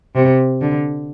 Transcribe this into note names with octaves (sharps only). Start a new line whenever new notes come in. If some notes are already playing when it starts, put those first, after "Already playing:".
C3
D3